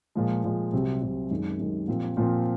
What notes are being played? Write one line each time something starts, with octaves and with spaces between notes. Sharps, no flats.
A#2 F3 G#3
A#2 F3 G#3
C2 C3 F#3 C4
C2 C3 F#3 C4
F#2 D#3 G#3
F#2 D#3 G#3
A#2 F3 C4
A#2 F3 C4